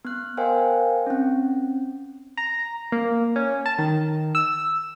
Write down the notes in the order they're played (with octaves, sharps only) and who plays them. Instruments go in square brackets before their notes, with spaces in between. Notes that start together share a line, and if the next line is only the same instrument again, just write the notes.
[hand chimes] B3 F#6
A#4 C5 D#5 F5 G5 G#5
C4 C#4
[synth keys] A#5
A#3
C#4
A5
D#3
E6